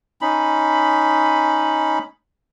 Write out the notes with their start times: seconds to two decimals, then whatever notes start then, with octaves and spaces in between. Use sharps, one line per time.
0.21 C#4 D#4 B5